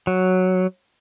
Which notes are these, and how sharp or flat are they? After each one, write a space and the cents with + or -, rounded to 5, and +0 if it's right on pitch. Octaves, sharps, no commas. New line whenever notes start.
F#3 +0